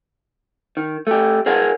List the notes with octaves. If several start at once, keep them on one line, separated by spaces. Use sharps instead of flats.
D#3
A3 G4
G#4 A#4 C#5 F#5